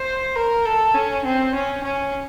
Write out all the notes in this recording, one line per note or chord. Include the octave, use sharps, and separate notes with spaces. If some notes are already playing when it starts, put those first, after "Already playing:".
Already playing: C5
A#4
A4
C#4
C4
C#4
C#4